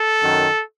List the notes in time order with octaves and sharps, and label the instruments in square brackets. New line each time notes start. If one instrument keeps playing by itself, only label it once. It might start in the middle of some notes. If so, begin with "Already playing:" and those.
Already playing: [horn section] A4
F#2 D#3 F#3